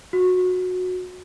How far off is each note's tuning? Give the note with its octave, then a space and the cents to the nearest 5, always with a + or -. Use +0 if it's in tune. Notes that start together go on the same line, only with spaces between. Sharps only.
F#4 -20